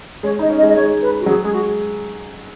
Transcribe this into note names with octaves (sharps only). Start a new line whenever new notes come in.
G#3 C#5
D#4 D#5
C#4
D#5
G#3
D#5
G#3 C#5
B4
F#4
F#3 G#4
G#3 G#4
F#4